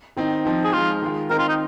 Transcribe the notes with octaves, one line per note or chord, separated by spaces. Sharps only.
D#3 C4 D#4
F3 C4 D#4
G#4
F3 G#3 D#4 F4
D#3 G#3 F4
D#3 C4 D#4 A#4
F4
D#4